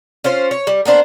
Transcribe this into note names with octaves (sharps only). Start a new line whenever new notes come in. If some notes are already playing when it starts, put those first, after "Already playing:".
C#4 F4 C5
C#5
G3
A#3 B3 D4 C5